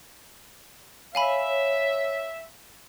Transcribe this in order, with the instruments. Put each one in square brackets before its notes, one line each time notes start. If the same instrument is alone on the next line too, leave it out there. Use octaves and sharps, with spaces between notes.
[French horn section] C#5 [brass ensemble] E5 [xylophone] F5 G#5 B5